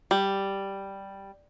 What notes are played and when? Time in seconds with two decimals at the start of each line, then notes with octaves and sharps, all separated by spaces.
0.11 G3